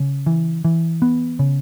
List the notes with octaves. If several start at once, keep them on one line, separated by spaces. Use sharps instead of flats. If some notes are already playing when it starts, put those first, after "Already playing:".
Already playing: C#3
E3
E3
B3
C#3